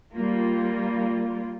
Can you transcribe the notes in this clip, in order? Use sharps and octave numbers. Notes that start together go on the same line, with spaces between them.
G3 A#3 F4